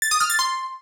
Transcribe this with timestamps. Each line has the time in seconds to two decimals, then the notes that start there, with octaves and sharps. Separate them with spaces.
0.02 A6
0.11 D#6
0.20 F6
0.30 A6
0.39 C6